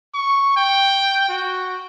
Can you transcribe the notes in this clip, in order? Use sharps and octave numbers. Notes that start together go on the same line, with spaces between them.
C#6
G5
F#4